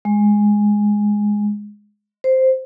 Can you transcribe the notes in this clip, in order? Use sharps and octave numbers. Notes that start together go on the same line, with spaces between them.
G#3
C5